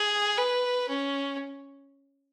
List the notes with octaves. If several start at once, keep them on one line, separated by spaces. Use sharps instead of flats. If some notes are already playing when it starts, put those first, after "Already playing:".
Already playing: G#4
B4
C#4